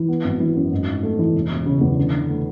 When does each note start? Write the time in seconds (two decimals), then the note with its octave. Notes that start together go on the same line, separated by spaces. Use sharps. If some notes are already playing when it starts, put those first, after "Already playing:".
Already playing: E3
0.09 B3
0.24 G#1
0.40 E3
0.56 F#2
0.72 G#2
0.87 G#2
1.03 A3
1.19 E3
1.34 E1
1.51 E1
1.66 C#3
1.81 E2
1.97 D3
2.13 D3
2.29 A3